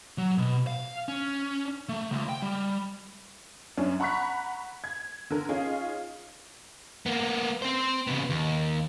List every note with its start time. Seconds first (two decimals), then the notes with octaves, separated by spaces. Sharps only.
0.18 F#3
0.38 B2
0.67 F5
1.08 C#4
1.89 A3
2.12 C#2
2.29 G5
2.42 G3
3.77 F#2 C#4 D4
4.00 F#5 A#5 B5 C#6 F#6 B6
4.84 G#6
5.30 D3 A#4
5.49 C#4 D#4 F4 G#4
7.06 A#3 B3
7.62 C4 C5
8.07 C#3 B3
8.30 D#2